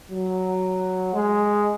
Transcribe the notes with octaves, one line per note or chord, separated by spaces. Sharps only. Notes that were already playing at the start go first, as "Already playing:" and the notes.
F#3
G#3